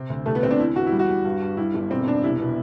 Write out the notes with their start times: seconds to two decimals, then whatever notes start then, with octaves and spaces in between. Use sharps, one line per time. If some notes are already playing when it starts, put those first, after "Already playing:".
Already playing: C3 C4
0.10 D2
0.26 C2 A3
0.35 B3
0.43 C2 C4
0.51 D4
0.60 D3 E4
0.76 E2 F#4
0.87 E4
0.92 G3
0.99 F#4
1.09 G3
1.25 G2
1.42 G2
1.57 G3 E4
1.74 G1
1.91 E1 C4
2.07 E1 D4
2.24 C2 E4
2.40 B2